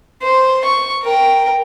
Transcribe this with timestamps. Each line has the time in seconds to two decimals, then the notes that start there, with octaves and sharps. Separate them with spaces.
0.22 C5
0.64 C#6
1.03 A#4 G5